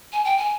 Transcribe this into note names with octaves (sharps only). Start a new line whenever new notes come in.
G#5
G5
G#5